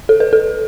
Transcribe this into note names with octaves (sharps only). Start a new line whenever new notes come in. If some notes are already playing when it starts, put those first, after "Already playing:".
A4
B4
A4